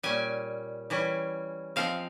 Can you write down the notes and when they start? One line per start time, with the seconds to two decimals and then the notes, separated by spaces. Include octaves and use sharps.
0.03 A#2 G3 C#4 G#5
0.90 E3 G3 C#4
1.76 F3 G#3 C4 F5